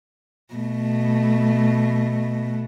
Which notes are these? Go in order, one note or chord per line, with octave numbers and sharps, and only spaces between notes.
B2 A3